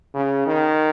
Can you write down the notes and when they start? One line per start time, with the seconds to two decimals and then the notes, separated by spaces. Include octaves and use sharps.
0.14 C#3
0.46 D#3